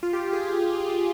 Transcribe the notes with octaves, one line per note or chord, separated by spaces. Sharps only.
F4
G4
G#4